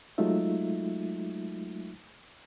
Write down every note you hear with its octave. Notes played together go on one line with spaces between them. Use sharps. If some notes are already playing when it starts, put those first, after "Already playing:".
F#3 G#3 A3 D#4 F4 E5